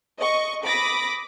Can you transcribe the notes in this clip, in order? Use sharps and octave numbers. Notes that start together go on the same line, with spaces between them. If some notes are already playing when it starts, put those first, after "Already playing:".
D#5 C#6
B5 D6 D#6 A#6